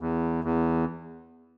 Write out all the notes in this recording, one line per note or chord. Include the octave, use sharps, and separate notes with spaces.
E2
E2